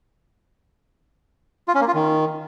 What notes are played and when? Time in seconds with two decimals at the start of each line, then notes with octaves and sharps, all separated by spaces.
1.68 F4
1.75 C#4
1.81 A#3
1.88 F4
1.94 D#3